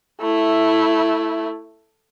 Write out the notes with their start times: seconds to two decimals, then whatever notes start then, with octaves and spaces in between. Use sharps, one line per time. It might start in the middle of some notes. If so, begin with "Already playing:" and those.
0.21 A3 E4